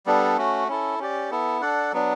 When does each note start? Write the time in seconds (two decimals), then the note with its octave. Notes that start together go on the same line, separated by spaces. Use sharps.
0.06 G3 B3 D4 A4
0.37 A3 C#4 F#4
0.68 C#4 E4 A4
0.99 C#4 G4 D5
1.30 B3 E4 A4
1.61 D4 A4 D5 F#5
1.92 F#3 B3 D4